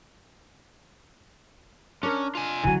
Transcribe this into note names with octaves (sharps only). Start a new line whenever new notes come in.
C#4 D4 A#4
F4 G#5
D3 E3 F#3 C#4 G#5